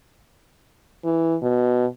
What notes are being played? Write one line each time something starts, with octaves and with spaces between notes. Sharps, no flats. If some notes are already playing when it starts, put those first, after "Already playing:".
E3
B2